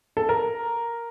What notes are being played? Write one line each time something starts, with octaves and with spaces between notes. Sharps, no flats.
A4
A#4